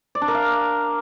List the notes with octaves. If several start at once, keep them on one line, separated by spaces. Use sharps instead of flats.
D5
D4
A#4
F5